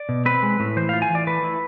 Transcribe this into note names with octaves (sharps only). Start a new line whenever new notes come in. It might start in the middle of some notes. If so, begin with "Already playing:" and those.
Already playing: D5
B2
C4 B4
G#3
A2
E3 C5
F4 F5
G#5
E3 D5
A3 B4
E4